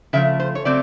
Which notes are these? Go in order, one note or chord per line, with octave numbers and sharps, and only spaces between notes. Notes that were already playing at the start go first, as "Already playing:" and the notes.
C#3 F3 A3 E5
C5
C#5
C#3 F#3 A3 C4 D5